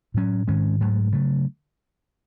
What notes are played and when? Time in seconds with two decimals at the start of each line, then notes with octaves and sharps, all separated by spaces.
0.14 A2 F#3 C#4
0.48 G#2 D#3 G#3 C#4
0.80 G#2 F#3 A3
1.12 C#3 F#3 A3